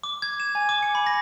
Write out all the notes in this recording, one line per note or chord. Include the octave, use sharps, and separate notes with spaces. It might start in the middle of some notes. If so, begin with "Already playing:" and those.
D6
G#6
E7
G#5
D6
C#7
B5
A#6